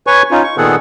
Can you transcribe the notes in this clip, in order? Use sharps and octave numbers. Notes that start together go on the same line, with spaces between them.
B4 C#5 G#5 C#6
C#4 D#4 F4
C#6
A#2 D#3 B3 G#4 A4 F#5